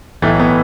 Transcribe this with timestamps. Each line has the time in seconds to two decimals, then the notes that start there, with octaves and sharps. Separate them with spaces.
0.22 B1 A2 E3 A3
0.39 B3